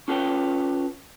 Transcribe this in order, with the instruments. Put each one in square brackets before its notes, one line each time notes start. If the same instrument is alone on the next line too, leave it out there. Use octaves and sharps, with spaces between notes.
[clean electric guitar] C#4 F4 A4 B4 C#5 G5